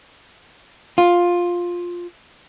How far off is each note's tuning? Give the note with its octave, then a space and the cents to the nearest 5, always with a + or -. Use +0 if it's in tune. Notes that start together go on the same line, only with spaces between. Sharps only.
F4 +10